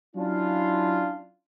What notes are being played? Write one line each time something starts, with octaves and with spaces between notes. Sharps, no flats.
F#3 C#4 D4 E4 F4